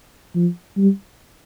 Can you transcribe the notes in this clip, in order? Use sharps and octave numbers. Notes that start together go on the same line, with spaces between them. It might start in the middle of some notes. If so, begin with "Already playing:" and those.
F3
G3